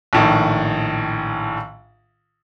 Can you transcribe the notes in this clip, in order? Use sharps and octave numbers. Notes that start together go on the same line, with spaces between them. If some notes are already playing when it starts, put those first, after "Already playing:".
A#1 A2 D#3